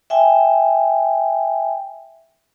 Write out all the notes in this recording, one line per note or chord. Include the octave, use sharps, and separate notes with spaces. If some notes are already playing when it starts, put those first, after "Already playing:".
E5 G5 G#5